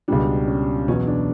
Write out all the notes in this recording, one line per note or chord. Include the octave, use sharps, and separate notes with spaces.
C#2 B2 G3 D4
C#4
E2 B2 F#3 C#4
D4